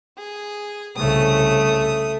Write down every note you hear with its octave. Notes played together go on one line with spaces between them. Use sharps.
G#4
C2 C#3 A3 D#6